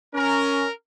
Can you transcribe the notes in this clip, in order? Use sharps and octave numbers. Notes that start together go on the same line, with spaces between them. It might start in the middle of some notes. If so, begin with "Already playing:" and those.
C#4 A#4